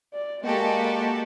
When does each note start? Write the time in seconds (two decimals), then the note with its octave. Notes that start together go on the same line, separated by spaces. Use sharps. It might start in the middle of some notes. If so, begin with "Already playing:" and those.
0.13 D5
0.44 G#3 A#3 F#4 G4 A4